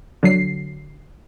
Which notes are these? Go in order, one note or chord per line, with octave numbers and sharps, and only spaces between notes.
D3 F#3 C7